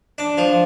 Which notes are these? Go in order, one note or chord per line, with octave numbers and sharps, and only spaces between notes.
D4
F3